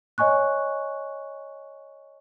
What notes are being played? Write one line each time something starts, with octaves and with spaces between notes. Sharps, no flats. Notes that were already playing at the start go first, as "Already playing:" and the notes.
C#5 D#5 G#5 C#6 F#6